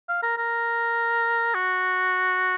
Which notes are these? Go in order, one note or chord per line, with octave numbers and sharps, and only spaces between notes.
F5
A#4
A#4
F#4